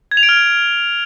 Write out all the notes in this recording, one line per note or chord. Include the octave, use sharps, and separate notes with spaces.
G#6
F7
D7
F6